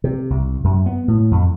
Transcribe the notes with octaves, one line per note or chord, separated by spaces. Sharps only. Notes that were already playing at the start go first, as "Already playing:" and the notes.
C3
C2
F#2
B3
A2
F2